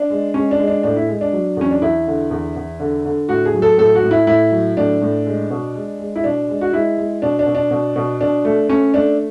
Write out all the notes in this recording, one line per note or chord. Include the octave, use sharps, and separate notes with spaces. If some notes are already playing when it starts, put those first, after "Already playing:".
Already playing: D4
G#3
G#3 C#4
D4
G#3
D4
A2 D4
E4
G#3
D4
F#3
E2 C#4
D4
E2 E4
D3
E2
E2
D3
D3
A2 F#4
G#4
F#3
A4
A2 A4
F#4
A2
E4
A2 E4
F#3
A2 D4
A2
G#3
B2
G#3
G#3
E4
B2 D4
G#3
F#4
G#3 E4
G#3
B2 D4
D4
B2
D4
B2
B2
B2 D4
A3
A3 C#4
A3 D4